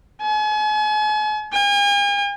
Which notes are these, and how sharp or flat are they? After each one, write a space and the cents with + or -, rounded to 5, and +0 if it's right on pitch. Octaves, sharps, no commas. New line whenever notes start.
G#5 +40
G#5 -45